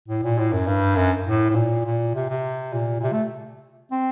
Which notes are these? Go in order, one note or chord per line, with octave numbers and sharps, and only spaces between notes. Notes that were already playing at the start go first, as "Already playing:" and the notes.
A2
A#2
A2
F#2
G2
F#2
A2
A2
A#2
A#2
C3
C3
A#2
A#2
C3
A3
C4